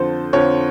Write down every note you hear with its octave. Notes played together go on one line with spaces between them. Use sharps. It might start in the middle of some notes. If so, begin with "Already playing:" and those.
Already playing: F2 D3 F3 A4 C5
F2 D3 F3 C#5